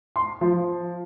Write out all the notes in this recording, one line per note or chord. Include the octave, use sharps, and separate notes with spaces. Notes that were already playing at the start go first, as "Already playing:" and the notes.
C6
F3